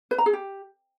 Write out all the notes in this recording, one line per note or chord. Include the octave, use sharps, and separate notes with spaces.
B4
A#5
G#4
G4